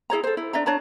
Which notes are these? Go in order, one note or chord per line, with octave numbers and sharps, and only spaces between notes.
E4 G#4 C#5 A#5
A4 C5
E4
D4 D5 E5 A#5
D4 C#5 A5 A#5